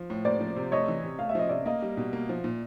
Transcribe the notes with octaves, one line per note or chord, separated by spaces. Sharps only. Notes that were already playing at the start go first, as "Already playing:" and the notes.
Already playing: F3
A2
A#3 C5 D5
F3
C3
A3 C#5 D#5
E3
C3
A3 F5
E5
F3 D#5
C3 D5 E5
A#3 D#5 F5
G3
B2
A#3
F3
A#2